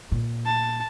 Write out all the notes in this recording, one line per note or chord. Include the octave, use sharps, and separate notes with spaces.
A#2
A5